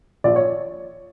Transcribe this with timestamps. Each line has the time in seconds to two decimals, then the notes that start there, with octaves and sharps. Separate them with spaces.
0.24 A#1 D5
0.36 C#5